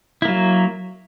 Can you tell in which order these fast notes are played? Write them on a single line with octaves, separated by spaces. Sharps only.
E4 A#3 F#3